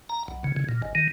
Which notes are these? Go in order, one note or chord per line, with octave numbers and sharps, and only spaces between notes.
A#5
B1
C#3
C#3
A#2
G#1
D#3